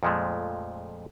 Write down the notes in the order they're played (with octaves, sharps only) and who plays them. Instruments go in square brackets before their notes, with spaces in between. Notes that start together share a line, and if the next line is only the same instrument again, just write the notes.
[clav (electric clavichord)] F2 A#2 F3 G#3 A3